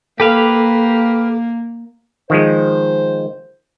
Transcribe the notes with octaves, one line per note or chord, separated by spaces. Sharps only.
A#3 G4 A4 B4 F5
D#3 F3 G#3 C5